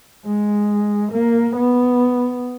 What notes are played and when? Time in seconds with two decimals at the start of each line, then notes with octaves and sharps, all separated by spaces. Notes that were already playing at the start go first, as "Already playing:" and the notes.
0.26 G#3
1.12 A#3
1.56 B3